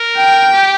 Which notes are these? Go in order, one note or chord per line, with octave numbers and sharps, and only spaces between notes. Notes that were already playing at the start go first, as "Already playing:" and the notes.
Already playing: A#4
G5
G4